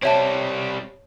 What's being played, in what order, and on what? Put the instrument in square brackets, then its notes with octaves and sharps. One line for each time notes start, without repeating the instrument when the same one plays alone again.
[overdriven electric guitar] G3 C4 [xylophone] C#5 E5 A5